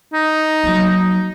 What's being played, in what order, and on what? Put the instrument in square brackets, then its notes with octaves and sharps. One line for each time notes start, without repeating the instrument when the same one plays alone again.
[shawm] D#4
[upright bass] F#3 A#3